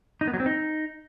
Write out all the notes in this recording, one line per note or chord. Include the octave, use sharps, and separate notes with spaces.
D#4
B3
F#3
C4
D#4